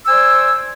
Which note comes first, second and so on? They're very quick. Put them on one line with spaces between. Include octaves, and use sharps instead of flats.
E6 G#5 C5 D5